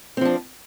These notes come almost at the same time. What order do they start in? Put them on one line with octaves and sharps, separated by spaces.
C4 F3 D4